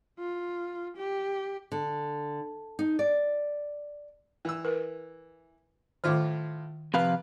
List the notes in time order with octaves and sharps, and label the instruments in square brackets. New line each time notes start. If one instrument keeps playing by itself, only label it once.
[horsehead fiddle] F4
G4
[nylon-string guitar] D3
D#4
D5
[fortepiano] E3 E6
[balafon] A#4 B4
[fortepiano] A2 F4 F6 [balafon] D#3 C6 D6
[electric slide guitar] C3 F3 F5 [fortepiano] B4